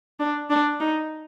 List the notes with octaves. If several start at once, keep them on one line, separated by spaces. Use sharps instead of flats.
D4
D4
D#4